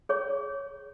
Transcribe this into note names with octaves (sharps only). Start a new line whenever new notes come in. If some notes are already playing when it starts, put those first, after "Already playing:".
G#4 C#5 C#6